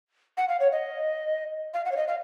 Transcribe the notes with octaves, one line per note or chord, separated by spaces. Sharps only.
F#5
F5
C#5
D#5
F5
F#5
C#5
D#5
F5